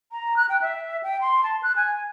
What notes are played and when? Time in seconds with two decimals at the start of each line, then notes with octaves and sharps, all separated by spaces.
0.12 A#5
0.37 F#6
0.49 G5
0.62 E5
1.03 G5
1.21 C6
1.43 A5
1.63 F#6
1.76 G#5